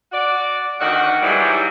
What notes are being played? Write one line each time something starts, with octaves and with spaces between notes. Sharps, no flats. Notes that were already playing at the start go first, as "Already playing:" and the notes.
F#4 D5
D2 D#3 F#4 D5 F#5
G#2 E3 F#3 G3